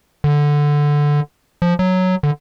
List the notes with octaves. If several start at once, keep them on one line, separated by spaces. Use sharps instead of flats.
D3
F3
F#3
D3